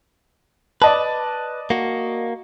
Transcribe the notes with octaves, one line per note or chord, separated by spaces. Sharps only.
B4 D5 D#5 A5
A#3 F#4